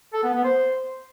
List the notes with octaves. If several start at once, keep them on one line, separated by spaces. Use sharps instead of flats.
A4
B3
B3
C5